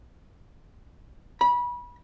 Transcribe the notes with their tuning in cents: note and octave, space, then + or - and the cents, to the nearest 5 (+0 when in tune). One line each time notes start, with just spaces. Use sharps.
B5 -25